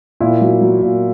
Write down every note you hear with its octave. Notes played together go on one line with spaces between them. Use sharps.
A#2 E4
F#3
F#3
A#2